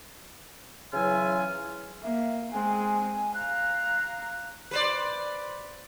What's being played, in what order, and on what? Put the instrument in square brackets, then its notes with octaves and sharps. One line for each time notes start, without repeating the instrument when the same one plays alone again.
[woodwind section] C#3 E3 F#3 F4 E5 G#5
[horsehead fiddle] A#3 [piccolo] E5
[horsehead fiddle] G#3 C4 [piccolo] G#5
[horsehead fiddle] F5 A#5 [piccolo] F#6
[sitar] B4 C5 D5